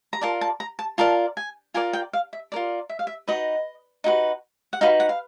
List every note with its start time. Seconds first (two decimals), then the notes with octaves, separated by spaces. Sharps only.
0.13 A#5
0.21 F4 A#4 D5 A5
0.41 A5
0.60 A#5
0.79 A5
0.98 F4 A#4 D5 A5
1.37 G#5
1.74 F4 A#4 D5 G#5
1.93 G5
2.13 F5
2.33 E5
2.52 F4 A#4 D5
2.89 E5
2.99 F5
3.07 E5
3.28 D#4 F#4 B4 D#5
4.04 D#4 F#4 B4
4.73 F#5
4.81 D#4 F#4 B4 F5
5.00 F#5
5.09 F5